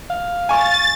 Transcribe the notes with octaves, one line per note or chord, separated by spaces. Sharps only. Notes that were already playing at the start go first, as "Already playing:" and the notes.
F5
G#5 C#6 A6